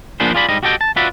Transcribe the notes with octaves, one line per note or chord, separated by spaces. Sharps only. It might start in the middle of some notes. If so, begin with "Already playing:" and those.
F3 A#3 B3 D4 G#4 C5
F4 G#4 D5 B5
G#2 G3 D#5
F#4 G4 A4 D#5 G5
A5
F4 F#4 B4 D5 E5